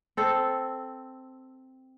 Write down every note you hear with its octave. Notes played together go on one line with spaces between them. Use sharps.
C4 A4